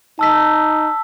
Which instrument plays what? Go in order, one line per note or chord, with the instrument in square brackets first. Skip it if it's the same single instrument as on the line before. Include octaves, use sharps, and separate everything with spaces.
[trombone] D#4 [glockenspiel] A5 E6 B6